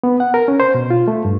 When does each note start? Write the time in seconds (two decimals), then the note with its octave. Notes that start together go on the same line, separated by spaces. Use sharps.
0.03 B3
0.20 F#5
0.34 A#4
0.48 C#4
0.60 C5
0.74 B2
0.90 F4
1.08 A3
1.25 G2